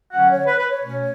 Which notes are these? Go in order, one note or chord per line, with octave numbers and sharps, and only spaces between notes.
D3 F#3 C#4 F#5
C#5
B4
B4
C#5
B2 A3 C#4